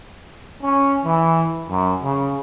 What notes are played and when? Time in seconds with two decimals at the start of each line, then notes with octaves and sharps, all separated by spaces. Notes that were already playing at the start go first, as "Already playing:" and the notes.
0.63 C#4
1.05 E3
1.70 F#2
2.03 C#3